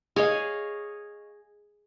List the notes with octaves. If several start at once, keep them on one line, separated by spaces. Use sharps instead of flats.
G#4 C#5 D#5 F5